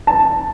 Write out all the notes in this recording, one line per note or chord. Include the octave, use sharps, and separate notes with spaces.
A5